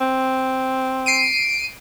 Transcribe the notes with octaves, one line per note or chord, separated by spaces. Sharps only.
C4
C7 D7 D#7